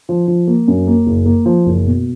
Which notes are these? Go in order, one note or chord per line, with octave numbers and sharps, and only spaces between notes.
F3
F3
A#3
F#2
A#3
F#1
A#3
F3
F#1
B2